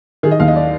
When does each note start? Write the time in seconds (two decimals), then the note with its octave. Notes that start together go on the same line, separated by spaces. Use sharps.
0.23 D#3 G#4
0.31 D#5
0.40 D#2 F5
0.48 D#5
0.56 D5